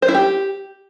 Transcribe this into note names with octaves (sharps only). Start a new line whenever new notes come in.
C5
E4
G4